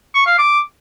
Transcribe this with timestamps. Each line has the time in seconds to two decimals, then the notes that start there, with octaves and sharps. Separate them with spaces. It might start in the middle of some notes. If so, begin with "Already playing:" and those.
0.14 C#6
0.26 F5
0.38 D6